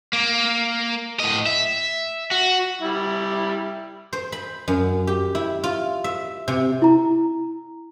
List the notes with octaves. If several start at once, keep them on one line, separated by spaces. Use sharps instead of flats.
A#3
A2 D#5
E5
F#4
G3 E4
C5
B5
F#2
G4
E4
F4
E5
C3
E4 A#5